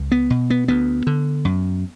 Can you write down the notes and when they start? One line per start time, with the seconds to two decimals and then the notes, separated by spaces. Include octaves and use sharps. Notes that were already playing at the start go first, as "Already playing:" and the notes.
Already playing: C#2
0.12 B3
0.30 B2
0.50 B3
0.68 D2 B3
1.07 D3
1.45 F#2